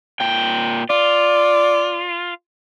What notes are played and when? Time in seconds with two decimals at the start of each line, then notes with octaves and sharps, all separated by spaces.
0.20 A#2 G5
0.90 F4 D5